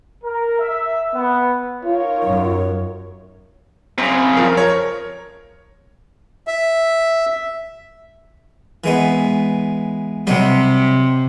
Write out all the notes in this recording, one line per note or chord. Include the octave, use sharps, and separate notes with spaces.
A#4
E5
B3
D#4 F4 A#4 C#5
F#2
F#2 C#3 C4
F3 A#4
A#4 C#5
E5
E3 G#3 B3
C3 F#3 G3 D#5